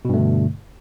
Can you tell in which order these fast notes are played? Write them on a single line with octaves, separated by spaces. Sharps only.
B2 G2 A3 D3